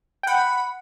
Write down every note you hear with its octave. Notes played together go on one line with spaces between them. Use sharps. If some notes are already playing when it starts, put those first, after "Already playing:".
G5
F#5 B5